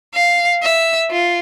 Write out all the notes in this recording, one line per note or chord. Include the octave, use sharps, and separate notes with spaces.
F5
E5
F4